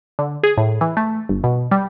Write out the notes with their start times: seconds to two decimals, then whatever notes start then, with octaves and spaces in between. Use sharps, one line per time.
0.19 D3
0.43 G#4
0.57 A2
0.81 E3
0.97 A3
1.29 G1
1.44 B2
1.71 G3